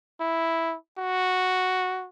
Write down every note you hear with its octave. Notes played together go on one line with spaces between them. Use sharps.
E4
F#4